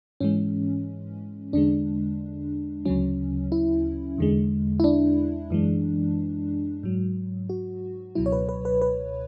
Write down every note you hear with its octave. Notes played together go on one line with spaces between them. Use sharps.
G#2 E3 G#3 C#4
E2 D3 G#3 D4
D2 C#3 F#3 C#4
E4
E2 D3 G#3
E4
D4
F#2 E3 G#3
G#2 F#3
F#4
C#2 B2 F#3 E4
C#5
B4
B4
B4
B4